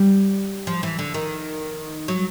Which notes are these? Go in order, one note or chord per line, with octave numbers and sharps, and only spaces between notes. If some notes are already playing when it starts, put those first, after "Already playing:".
Already playing: G3
F3
E3
D3
D#3
F#3